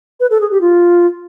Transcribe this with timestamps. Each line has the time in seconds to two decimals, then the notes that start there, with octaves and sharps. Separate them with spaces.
0.20 B4
0.30 A4
0.41 G#4
0.51 G4
0.61 F4